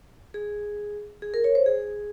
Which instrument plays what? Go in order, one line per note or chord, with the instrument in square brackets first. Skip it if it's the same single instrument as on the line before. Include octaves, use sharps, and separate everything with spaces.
[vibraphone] G#4
G#4
A#4
C#5
C5
G#4